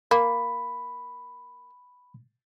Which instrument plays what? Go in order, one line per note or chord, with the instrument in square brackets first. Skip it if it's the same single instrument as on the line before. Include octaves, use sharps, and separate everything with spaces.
[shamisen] A#3 [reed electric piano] B5